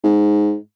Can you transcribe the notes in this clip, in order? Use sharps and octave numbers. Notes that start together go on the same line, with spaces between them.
G#2